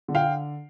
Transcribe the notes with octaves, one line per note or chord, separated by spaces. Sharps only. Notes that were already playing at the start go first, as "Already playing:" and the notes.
D3
F5 G5